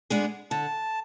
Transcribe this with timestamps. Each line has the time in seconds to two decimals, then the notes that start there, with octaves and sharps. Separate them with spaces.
0.10 G#3 B3 D4 G#4
0.51 D3 A5